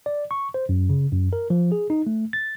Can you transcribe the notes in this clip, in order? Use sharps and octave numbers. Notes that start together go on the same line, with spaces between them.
D5
C#6
C5
F#2
C#3
F#2
A#4
F3
G#4
D#4
A3
A6